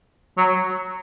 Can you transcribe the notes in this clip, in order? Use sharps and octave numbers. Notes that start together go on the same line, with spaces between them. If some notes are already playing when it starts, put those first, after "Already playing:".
F#3